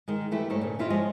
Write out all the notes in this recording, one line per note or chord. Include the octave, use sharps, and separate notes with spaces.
D#3 G#3
E3 A3 E4 G4
G#2 A3 D#4 A4 C#5
A#2 C#3
D#2 E4 F4 G4 D#5
F3 G#3 C#5 D#5